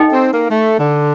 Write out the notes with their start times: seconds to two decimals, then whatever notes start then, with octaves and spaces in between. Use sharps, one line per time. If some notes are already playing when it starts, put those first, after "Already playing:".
Already playing: D#4 A4 D#5 G5
0.11 C4
0.31 A#3
0.49 A3
0.78 D3